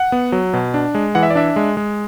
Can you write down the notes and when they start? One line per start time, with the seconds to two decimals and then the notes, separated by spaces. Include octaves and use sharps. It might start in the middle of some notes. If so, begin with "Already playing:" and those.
Already playing: F#5
0.12 B3
0.32 F#3
0.53 B2
0.74 D4
0.95 G#3
1.15 E3 F#5
1.23 E5
1.30 D5
1.35 D4 E5
1.56 G#3
1.77 G#3